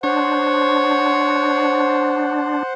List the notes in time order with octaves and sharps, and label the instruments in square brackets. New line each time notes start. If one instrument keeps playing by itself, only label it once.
[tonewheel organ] D4 [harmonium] C5 F#5 [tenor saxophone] C#5